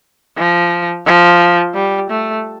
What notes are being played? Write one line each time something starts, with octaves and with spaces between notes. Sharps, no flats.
F3
F3
G3
A3